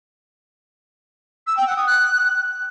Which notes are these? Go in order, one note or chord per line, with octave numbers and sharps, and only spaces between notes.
E6
G5
F#5
D#6
F#6